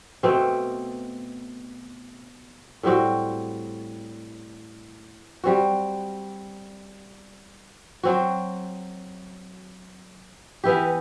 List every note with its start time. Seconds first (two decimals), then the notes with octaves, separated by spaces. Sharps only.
0.23 B2 A3 C4
2.83 A2 G3 C4 F#4
5.44 G3 C4 F#4
8.03 F#3 C4 F#4
10.64 E3 B3 E4 G4